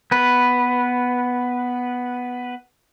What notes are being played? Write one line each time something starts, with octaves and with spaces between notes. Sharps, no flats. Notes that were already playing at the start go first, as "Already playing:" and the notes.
B3 B4